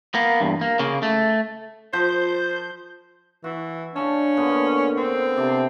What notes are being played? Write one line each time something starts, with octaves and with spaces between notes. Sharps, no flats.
A#3 B3
E2 G2
A#3
C#3 A#3
A3
F3 C5 G6
E3 F#4
C#3 C#4 D4 A5
A#2 D3 B3
C4
C3 D5 A5